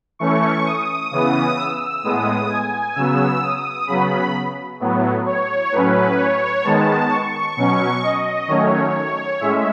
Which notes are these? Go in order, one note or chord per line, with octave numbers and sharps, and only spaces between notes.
E3 A3 C#4 C#6
D#6
C#3 E3 B3
E6
A2 G#3 B3 D#6
G#5
C#3 F#3 B3 E6
D#6
C#3 F#3 B3 B5
A2 F#3 B3
C#5
A2 F#3 C#4 B4
C#5
D#3 G#3 B3 A5
C#6
B2 F#3 C#4
D#5
D#3 F#3 A3 C#4 C#5
A2 G#3 C#4 E5